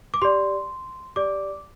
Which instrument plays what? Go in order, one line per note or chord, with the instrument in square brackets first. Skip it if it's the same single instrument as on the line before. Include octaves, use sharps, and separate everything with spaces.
[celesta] D6
G4 D5 C6
G4 D5 D6